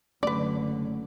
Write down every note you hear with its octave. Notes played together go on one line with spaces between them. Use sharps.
F#1 D3 F#3 A3 C#4 B4 D5